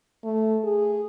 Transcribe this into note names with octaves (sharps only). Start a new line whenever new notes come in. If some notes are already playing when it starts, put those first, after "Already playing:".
A3
G#4